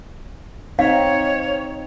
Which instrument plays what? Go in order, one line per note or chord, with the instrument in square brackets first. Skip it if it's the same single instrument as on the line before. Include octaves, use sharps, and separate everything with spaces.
[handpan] C4 D#4 [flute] C#5 [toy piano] F5